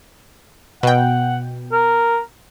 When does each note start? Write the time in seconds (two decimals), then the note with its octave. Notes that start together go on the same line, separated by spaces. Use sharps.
0.83 B2 F#5 G5
1.72 A#4